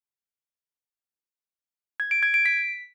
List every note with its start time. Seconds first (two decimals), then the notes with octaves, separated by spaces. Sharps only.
2.00 G#6
2.11 D7
2.23 G#6
2.34 D7
2.45 B6